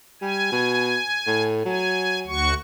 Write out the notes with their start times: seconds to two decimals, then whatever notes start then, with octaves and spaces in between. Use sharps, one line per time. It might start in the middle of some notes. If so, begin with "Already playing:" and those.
0.22 G3 G#5
0.52 B2
1.27 A2
1.66 F#3 G#5
2.27 D2 F#4 C#6